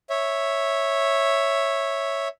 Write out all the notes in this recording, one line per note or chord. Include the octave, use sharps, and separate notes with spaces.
C#5 E5